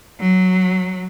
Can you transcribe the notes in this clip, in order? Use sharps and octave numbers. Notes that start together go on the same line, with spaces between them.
F#3